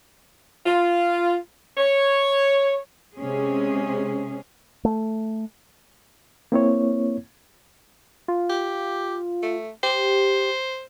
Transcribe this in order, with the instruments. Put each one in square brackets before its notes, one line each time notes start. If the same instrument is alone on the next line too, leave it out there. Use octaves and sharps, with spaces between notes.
[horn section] F4
C#5
[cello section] C3 G#3 C#4 G#4
[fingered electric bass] A3
[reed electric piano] A#3 C4 E4 C#5
[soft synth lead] F4
[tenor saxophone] G4
A3
[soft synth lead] G4 [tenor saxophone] C5